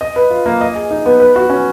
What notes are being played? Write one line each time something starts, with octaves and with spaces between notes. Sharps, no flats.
D#5
B4
F4
A#3
D#5
G#4
D#4
B3
B4
F#4
C#4